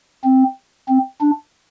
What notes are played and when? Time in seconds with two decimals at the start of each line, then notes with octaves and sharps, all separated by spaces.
0.24 C4
0.88 C4
1.21 D4